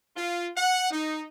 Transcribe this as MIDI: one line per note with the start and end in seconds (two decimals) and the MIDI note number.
0.16 0.48 65
0.56 0.88 78
0.91 1.24 63